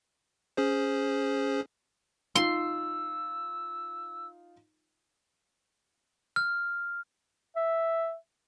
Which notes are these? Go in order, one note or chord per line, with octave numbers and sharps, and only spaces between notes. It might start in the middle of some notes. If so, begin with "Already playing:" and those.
C#4 G#4 C5
D#4 F4 C6 E6
F6
E5